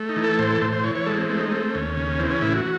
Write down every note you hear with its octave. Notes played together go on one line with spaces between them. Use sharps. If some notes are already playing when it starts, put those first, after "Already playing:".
Already playing: A3
D#4
E3
A4
A2 C5
A4
A2 C5
C5
E3 C#5
C#5
G#3 A4
C4
A3 C4
D#4
A3 C4
C4
D#2 C#4
C#3
E3 C4
C#4
A2 E4
F#4